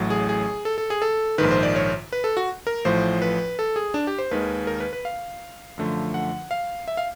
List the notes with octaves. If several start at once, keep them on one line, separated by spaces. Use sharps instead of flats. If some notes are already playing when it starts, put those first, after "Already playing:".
Already playing: A1 A2 F#3
G#4
G#4
A4
A4
G#4
A4
A#1 G#2 D#3 B4
C5
D5
C#5
B4
A4
F#4
A#4
A1 A2 F3 C5
B4
A4
G#4
D4
G4
C5
D#2 D#3 G#3 B4
A#4
B4
B4
F5
F#2 D3 F3 A3
F#5
F5
E5
F5